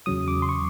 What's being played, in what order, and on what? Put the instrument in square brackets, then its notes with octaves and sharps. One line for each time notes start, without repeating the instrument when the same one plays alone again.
[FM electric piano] E2 C#3 F#3 D#6
D6
C6
C#6